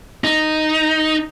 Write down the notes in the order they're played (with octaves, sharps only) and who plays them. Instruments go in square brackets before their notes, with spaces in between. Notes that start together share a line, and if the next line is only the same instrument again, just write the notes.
[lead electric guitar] D#4